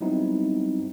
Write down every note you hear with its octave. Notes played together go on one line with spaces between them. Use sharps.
F#3 G3 B3 C4 D#4 E4